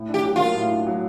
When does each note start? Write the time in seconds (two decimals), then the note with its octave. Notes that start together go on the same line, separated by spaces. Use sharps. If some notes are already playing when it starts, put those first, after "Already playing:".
Already playing: A2
0.09 D4
0.14 G4
0.24 F#3
0.36 A#3 F4
0.55 A2
0.71 D4
0.87 F#3